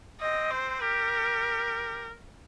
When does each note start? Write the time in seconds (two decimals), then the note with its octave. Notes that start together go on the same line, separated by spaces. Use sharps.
0.21 C4 D#5
0.51 C5
0.82 G4 A#4